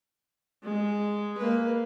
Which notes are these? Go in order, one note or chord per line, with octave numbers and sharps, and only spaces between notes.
G#3
A#3 B4